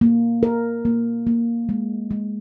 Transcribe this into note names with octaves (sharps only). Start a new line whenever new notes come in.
A#3
A#4
A#3
A#3
G#3
G#3